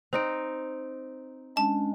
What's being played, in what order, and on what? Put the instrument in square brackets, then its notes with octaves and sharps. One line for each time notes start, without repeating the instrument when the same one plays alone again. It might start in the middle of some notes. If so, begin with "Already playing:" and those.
[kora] C4 D#4 [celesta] C5 D7
[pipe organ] G#3 C#4 D4 [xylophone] A5